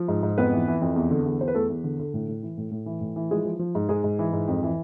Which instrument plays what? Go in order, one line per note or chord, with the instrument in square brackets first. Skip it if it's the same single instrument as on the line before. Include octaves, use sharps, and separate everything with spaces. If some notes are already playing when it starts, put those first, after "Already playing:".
Already playing: [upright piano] F3
G#2
G#2
F2 B3 B4
E3
E3
F2
E2
D3
E2
E2 C5
B4
E2 A3 A4
E2
D3
D3
A2
A2
E3
A2
A2
E3
A2
E3
F3 G#3 G#4
F3
F3
G#2
G#2 G#3 G#4
G#2
E3
G#2
F2
E3